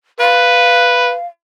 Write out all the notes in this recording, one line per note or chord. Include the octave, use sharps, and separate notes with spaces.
B4 F5